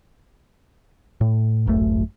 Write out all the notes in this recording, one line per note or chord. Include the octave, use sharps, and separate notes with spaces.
A2
D1 G#1 F#2 A3